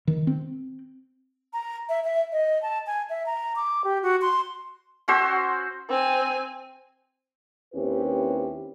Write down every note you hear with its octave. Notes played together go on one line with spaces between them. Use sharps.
D#3
C4
A#5
E5
E5
D#5
A5
G#5
E5
A#5
D6
G4
F#4
C6
C#4 F#4 C5 E6
C4 G#5
D#2 C4 C#4 E4 G4 B4